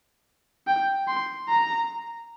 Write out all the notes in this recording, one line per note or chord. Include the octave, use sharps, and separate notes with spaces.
G5
C6
A#5